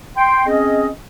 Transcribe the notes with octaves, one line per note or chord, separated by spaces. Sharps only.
G5 C6
C4 C#4 G#4 D#5